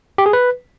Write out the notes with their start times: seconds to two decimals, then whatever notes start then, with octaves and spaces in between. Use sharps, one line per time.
0.18 G4
0.26 G#4
0.33 B4